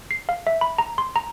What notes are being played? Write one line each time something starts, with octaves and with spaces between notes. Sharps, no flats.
C7
F5
E5
B5
A#5
C6
A#5